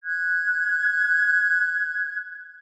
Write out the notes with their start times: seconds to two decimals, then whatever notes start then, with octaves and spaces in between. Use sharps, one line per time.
0.04 F#6 G#6